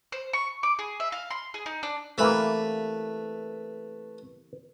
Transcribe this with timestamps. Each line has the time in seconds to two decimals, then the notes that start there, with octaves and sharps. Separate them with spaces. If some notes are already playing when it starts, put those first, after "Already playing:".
0.12 C5
0.33 C#6
0.63 D6
0.79 G#4
1.00 E5
1.12 F5
1.31 C6
1.54 G#4
1.66 D#4
1.83 D4
2.18 C3 E3 A3 A#3 B4